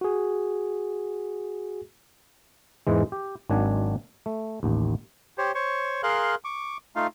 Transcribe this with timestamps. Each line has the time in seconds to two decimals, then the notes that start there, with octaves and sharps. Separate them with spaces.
0.01 F#4 G#4
2.87 E2 G#2 E3 G#3
3.12 G4
3.49 G#1 D#3 F#3 D4 G#5
4.26 A3
4.63 A1 D#2
5.38 G4 C5 C#5
5.55 C5 C#5 C#6
6.03 G#4 A#4 F5 C6 F#6
6.44 C#6 D6
6.96 A3 D#4 F4 F5